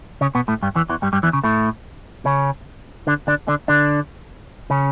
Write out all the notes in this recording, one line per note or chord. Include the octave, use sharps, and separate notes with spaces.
C#3 C#4
B2 B3
A2 A3
G2 G3
E2 E3
E2 E3
G2 G3
G2 G3
E2 E3
C#3
A2 A3
C#3 C#4
D3 D4
D3 D4
D3 D4
D3 D4
C#3 C#4